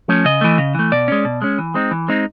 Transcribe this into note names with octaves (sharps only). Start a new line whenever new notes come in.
F3 A3 C#4
C#3 D#5
E3 A3
C#3
E3 A3
B2 D5
G#3 C#4
B2
G#3 C#4
E3
G#3 C4 D#4
E3
G#3 C4 D#4